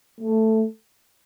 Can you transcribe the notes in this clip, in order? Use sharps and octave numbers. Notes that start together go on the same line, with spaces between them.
A3